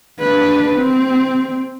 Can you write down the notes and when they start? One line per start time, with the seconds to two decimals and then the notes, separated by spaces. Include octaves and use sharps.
0.20 D4 B4
0.77 C4